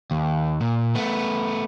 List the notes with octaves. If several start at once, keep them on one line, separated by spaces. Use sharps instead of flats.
D#2
A#2
A3 B3